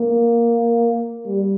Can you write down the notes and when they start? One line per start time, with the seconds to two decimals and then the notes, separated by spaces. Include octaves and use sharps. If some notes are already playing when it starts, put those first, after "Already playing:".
Already playing: A#3
1.26 G3